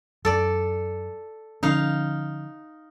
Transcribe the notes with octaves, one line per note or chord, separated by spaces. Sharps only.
F#2 A4 D5
D3 F3 C#4 D#4 F5